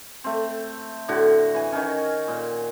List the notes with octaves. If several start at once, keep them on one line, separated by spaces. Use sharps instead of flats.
A3 C4
A2 D3 F#4
E3 G#5
D#3 C#4
A#2